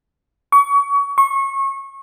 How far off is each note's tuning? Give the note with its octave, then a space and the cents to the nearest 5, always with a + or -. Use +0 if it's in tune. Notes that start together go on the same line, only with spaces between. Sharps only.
C#6 +30
C#6 -25